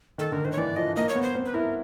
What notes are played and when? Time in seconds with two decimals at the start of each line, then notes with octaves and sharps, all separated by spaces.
0.18 D#3 A4
0.32 D3 A#4
0.45 D#3 C5
0.52 C#5
0.57 E3 D5
0.76 F3 D#5
0.96 A#3 D#5
1.09 C#5
1.15 B3
1.23 C5
1.35 C4
1.46 B4
1.54 E4 A#4